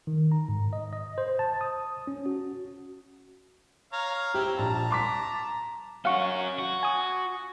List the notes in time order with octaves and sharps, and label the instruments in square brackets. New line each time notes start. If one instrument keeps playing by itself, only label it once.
[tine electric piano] D#3
A#5
G#2
D#5
D#5
C5
A5
D#6
C#4
F#4
[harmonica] C#5 F5 A#5
[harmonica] C4 E4 [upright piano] G4
[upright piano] A#1 [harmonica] A5 A#5
[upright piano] C6 D6 B6
[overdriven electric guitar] C#4 F#4 [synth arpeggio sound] F5 F#5 C#6
[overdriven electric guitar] F#4
[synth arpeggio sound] G#5 D#6